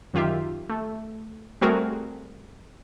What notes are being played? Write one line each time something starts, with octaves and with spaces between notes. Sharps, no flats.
F#2 D#3 F4 G4 E5
A3
G3 A3 C4 F#4 G#4 A#4